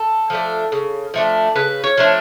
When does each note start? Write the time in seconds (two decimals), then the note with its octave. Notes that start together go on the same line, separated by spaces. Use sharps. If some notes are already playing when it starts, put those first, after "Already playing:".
Already playing: A4
0.30 F3 A3 D4
0.72 C#3
1.14 F3 A3 D4
1.55 C#3 B4
1.84 C#5
1.98 F3 A3 D4